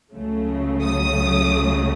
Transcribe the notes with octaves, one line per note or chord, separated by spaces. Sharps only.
C#2 C#3 F#3 A3
D#6